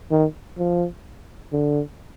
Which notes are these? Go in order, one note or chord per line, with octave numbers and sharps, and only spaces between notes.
D#3
F3
D3